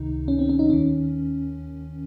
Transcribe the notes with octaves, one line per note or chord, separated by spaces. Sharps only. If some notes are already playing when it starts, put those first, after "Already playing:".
Already playing: C#2 C3 D#3 D#4
C#4
C4
C#4
D#4
D#2 D#3 C#4